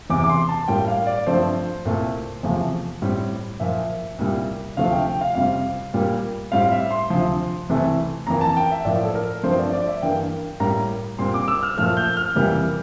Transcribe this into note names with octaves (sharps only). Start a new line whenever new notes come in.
E2 C3 E3 D6
D6
C6
A5
A2 G3 A#3 G5
F5
D5
G2 F3 A3 C4 C5
C2 A#2 A3
E2 C3 F3 A3
A2 G3 C4
A#2 F3 A#3 E5
C2 A#2 G3
D2 C3 F3 A3 F5
G5
G5
F5
F2 C3 G3 C4 F5
A#2 G3 A#3
A2 G3 C4 F5
E5
C6
D2 C3 F3
C2 C3 E3 A3 C4
F2 E3 A#3 A#5
A5
G5
E5
A2 F3 A#3 D5
A4
A#4
G2 F3 A3 C4 C5
D5
D5
E5
G2 E3 A#3 G5
A2 G3 A#3 A#5
A#2 G3 C4 C6
D6
E6
F6
A#2 F3 A3 F6
G6
F6
F2 C3 E3 G3 A#3